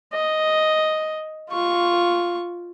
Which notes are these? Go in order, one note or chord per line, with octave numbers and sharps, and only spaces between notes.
D#5
F4 C#6